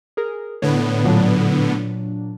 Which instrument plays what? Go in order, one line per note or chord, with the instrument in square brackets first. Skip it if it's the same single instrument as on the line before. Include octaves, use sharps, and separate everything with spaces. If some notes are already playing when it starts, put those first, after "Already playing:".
[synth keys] G#4 A#4
[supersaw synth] A2 D3 B3 [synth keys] C#5
[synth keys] A#2 F#3 D4